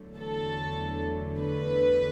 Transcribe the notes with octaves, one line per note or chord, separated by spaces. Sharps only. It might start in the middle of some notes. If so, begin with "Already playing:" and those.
Already playing: E2 D3 F#3 A3
A4
B4